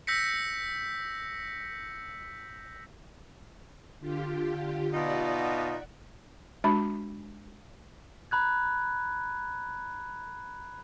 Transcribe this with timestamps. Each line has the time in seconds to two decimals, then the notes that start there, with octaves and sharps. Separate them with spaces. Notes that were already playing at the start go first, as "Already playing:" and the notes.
0.07 E6 G6 A#6 B6 C#7
4.00 D3 F4 G4
4.94 B2 D#4 F4 D5 E5 F#5
6.64 G#3 D4 F#4 B5
8.31 A#5 B5 F#6 G#6